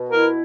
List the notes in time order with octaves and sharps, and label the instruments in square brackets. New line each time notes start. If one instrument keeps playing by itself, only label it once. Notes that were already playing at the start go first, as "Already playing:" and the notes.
Already playing: [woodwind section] B2
[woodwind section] E4 [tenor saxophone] A#4